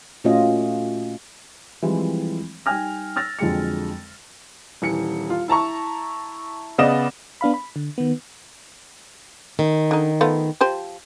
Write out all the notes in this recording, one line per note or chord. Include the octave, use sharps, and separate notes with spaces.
A#2 A3 C#4 F4 F#4 D#5
E3 F3 G3 G#3 C4 E4
G3 D#4 G5 G#5 F6 A#6
E6 F6 A6 A#6
F2 D3 F#3 G#3 G5 C#7
D#1 E3 C#7
F4
E4 A5 A#5 C#6
C#3 B3 D5 D#5 E7
B3 D4 F5 B5
B5
D3
D#3 B3
D#3
D3 D#4
A3 B3 F4
F3 G4 C5